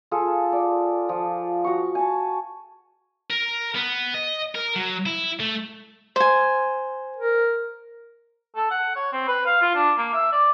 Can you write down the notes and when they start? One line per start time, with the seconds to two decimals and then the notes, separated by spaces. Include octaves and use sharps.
0.11 F4 G#4 A4
0.52 D5
1.09 F3
1.64 F#4 A#5 C#6
1.95 G#5 A5
3.30 A#4
3.75 B3
4.14 D#5
4.55 A#4
4.76 F#3
5.06 E4
5.40 A3
6.16 C5 G#5
7.17 A#4
8.56 A4
8.71 F#5
8.95 C#5
9.12 C4
9.28 B4
9.46 F5
9.61 F4
9.75 D4
9.97 A#3
10.13 E5
10.32 D5